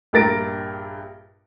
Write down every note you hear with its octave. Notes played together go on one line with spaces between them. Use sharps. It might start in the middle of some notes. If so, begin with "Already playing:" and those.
A#1 G2 A#4 A6 A#6 D7